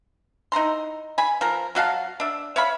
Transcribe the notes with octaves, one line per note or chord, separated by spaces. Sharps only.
D#4 E4 A#5 C6
G#5 B5
F3 A#4
F#3 F#4 F5 A5
D4 E5
C#5 E5 F5 B5